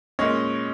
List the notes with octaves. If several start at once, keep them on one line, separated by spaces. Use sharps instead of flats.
A#2 G#3 C#4 D#5